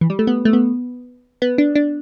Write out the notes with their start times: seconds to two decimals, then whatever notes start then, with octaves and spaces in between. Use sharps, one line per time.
0.01 E3
0.10 G3
0.19 A3
0.27 B3
0.45 A3
0.53 B3
1.42 B3
1.58 D4
1.76 D4